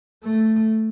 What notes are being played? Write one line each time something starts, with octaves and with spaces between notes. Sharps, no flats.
A3